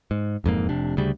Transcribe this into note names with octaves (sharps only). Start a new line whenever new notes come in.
G#2
E1 F2 G#2 A#3
F1 C3 D4
D2 C#3 G3